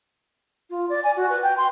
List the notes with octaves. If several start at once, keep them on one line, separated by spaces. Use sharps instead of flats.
F4
D5
G#5
F#4
B4
G5
C6